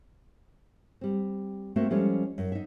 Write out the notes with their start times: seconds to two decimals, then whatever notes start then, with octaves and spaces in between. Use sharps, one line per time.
1.01 G3 C4
1.76 A3 A#3 C4 F#4
1.91 F3 G3 G#3 C#4 A4
2.38 F#2
2.52 D#4 E5